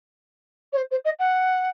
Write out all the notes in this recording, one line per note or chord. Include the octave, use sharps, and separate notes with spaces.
C#5
C5
C5
D#5
F#5